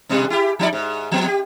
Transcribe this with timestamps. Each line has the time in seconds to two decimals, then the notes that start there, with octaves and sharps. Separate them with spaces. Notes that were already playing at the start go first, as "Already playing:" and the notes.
0.09 G#2 B2 G3
0.30 E4 G4
0.59 F3 D#4 D5
0.73 G#2
1.12 F3 B3
1.28 G4